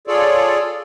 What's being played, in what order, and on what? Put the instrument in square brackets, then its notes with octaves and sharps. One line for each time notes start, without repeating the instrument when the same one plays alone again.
[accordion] F4 G#4 A4 C#5 D5